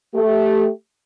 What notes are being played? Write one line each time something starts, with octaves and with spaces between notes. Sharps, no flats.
A3 G4